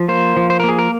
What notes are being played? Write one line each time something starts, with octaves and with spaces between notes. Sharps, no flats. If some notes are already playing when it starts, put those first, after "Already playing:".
Already playing: F3
A#3 C5
F3
C5
A#3 A#4
G#4
A#4